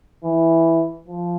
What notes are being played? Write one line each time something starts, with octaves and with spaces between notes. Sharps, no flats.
E3
F3